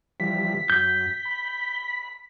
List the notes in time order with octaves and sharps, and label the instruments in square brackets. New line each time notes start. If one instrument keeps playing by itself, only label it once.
[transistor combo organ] E3 F3 G3 [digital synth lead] B6
[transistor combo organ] F#2 [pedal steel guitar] G6
[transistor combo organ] B5